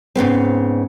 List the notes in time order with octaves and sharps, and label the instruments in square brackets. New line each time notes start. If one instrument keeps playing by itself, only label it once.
[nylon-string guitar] G#2 C#3 B3 C4